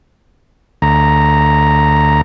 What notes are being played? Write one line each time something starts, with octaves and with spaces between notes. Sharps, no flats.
D2 A#5